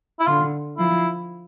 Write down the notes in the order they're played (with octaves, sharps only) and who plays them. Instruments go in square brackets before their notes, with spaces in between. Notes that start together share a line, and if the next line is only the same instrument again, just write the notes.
[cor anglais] E4
[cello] D3 [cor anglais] F4
[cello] F3 [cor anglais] E4